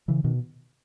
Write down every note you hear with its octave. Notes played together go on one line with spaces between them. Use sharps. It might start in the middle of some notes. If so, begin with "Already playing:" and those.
C#3 E3
B2 D#3